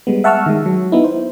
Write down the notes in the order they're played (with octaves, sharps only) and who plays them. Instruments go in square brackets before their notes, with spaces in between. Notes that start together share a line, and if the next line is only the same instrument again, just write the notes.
[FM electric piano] G3 G#3 B3
E5 F#5 A5 C#6 E6 F6
D#3 G#3
F#3
B3 D#4 E4
C5